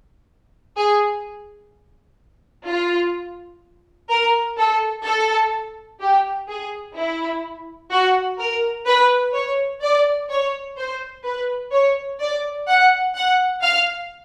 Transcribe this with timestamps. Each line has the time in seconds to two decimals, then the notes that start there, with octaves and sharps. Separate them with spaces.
0.77 G#4
2.67 F4
4.10 A#4
4.58 A4
5.05 A4
6.01 G4
6.48 G#4
6.96 E4
7.91 F#4
8.39 A#4
8.87 B4
9.34 C#5
9.82 D5
10.29 C#5
10.77 C5
11.25 B4
11.72 C#5
12.20 D5
12.68 F#5
13.15 F#5
13.62 F5